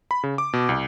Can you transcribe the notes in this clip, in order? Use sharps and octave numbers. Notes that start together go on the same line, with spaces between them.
B5
C#3
D6
B2
C2